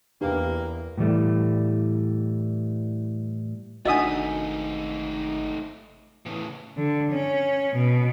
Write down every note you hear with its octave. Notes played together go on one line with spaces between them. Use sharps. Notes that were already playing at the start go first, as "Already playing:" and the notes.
E2 A#3 D4 G4 B4
A2 E3 G3 A3
G#1 A3 D4 D#4 F#4 D#5 E5 D#6
A2 C#3 E3
D3
C#4
B2